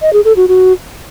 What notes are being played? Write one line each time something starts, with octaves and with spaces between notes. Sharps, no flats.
D#5
G#4
A4
F#4
F#4